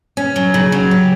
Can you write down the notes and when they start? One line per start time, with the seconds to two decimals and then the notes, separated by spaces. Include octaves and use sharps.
0.17 C#4
0.36 F#3
0.54 C#3
0.72 F#3
0.91 G4